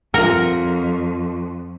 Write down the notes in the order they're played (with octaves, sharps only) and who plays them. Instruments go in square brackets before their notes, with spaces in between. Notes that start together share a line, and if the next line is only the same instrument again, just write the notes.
[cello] F2 [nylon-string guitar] F4 F#5 [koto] A#4